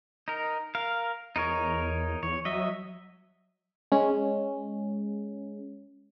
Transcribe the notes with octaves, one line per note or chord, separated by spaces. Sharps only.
D#4 A#4
A#4 F5
E2 D#4 A#4 C#5
E2 C#5
F#3 D#5 E5
G#3 C#4